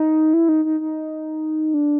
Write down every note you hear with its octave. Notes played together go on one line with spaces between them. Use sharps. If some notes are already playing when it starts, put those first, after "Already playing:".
Already playing: D#4
E4
D#4
D#4
D#4
D4